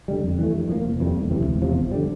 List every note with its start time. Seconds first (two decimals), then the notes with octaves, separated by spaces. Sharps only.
0.08 D3 G3
0.23 F2
0.39 E3 A3
0.54 G2
0.69 F3 A#3
0.85 F1
1.00 F2 E3
1.04 G3
1.16 E1
1.31 D2 C3 E3
1.46 E1
1.62 E2 C3 F3
1.77 G1
1.91 D3 G3